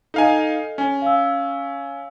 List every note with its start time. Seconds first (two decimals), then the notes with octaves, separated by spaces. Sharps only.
0.14 D#4 A4 D#5 F5 G#5
0.78 C#4 G#5
1.02 F5 E6